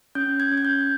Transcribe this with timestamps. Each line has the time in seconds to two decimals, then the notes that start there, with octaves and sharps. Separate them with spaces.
0.15 C#4 G6
0.40 G#6
0.52 C#4
0.58 G#6
0.65 G6